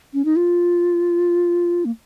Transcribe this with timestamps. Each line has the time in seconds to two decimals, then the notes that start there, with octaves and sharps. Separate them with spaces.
0.14 C#4
0.25 D#4
0.36 F4
1.85 A#3